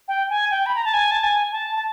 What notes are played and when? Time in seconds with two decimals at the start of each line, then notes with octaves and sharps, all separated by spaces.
0.08 G5
0.30 G#5
0.51 G5
0.66 B5
0.75 A#5
0.85 A5
0.94 G#5
1.11 A5
1.23 G#5
1.52 A5
1.76 A5